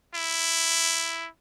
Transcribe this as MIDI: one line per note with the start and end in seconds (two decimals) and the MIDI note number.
0.15 1.28 64